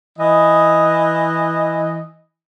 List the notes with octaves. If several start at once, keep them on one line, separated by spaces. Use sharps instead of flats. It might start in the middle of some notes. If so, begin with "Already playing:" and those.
E3 D#5